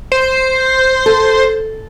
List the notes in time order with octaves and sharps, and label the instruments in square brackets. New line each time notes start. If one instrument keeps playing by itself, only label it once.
[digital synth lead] C5
[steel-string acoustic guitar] A4